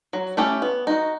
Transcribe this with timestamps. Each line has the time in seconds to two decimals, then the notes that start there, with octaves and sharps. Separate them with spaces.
0.13 F#3
0.37 A3 C#4 E4 G4
0.62 B3
0.87 D#4 F#4